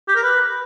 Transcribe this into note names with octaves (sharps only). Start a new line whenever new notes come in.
G4
A#4
B4